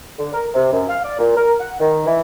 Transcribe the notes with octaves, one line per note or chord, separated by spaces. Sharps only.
D3
A#4
C3
F#2
F5
D5
A#2
A#4
F#5
D#3
E3